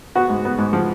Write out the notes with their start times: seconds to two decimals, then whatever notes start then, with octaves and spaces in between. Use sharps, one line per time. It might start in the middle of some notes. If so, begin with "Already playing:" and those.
0.15 B3 F#4
0.29 G#2
0.45 B3
0.58 G#2
0.73 F3